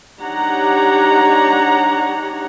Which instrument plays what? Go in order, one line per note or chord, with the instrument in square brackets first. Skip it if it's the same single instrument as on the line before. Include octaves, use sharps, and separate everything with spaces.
[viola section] D4 D#4 G4 C#5 F#5 A#5